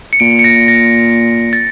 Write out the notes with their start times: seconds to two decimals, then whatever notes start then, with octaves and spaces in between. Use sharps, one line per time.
0.13 C#7
0.20 A#2 D7
0.39 C#7
0.44 A#6
0.68 A#6
1.53 A6